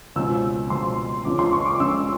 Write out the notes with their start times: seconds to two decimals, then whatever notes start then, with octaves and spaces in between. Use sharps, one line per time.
0.16 C#2 B2 G#3 C4 E6
0.70 C#2 B2 G#3 C4 C6
1.25 C#2 C#3 F3 G#3 C#4 D6
1.39 C6
1.53 C#6
1.66 D6
1.80 C#2 C#3 F3 G#3 C#4 E6